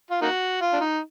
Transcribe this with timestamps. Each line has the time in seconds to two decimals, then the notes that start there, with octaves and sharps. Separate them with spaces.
0.11 F4
0.22 A#3 D#4 F#4
0.61 F4
0.73 D4
0.81 D#4